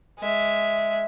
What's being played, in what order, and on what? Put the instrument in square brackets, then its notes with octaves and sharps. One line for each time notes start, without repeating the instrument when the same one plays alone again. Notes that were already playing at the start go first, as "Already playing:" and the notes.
[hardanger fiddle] G#3 E5